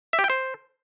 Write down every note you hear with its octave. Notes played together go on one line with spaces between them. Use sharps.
E5
G4
G5
C5